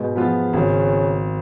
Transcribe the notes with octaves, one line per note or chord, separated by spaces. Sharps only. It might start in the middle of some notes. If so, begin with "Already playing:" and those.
Already playing: G#2 B2
F3 G#3 B3 F4
G#1 C#3